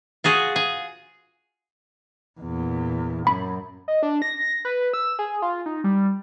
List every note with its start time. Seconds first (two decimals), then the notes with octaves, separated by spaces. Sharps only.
0.24 F4 F#4 G#4
0.56 G#4
2.41 E2 A#2
3.27 F#2 B5
3.88 D#5
4.03 D4
4.22 A#6
4.65 B4
4.93 E6
5.19 G#4
5.42 F4
5.66 D#4
5.84 G3